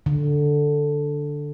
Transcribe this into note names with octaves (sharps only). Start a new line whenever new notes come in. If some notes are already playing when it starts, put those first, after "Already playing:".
D3